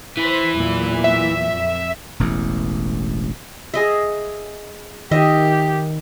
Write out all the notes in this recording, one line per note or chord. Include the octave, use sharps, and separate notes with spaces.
E3 E4 C5 B6
E2 A#2 F#3
E5
F2
E1 A1 E2
G#4 D#5 E5
D#3 G4 D#5 E5